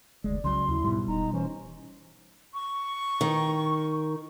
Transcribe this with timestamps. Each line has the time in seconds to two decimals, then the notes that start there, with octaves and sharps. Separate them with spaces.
0.24 F1 D2 G#3 D5
0.44 C2 C#3 F#3 C6
0.68 D#2 E4
0.84 G#2 B2 G3
1.07 E1 D#4 A#5
1.33 E3 C#4 C5
2.54 C#6
3.21 D#3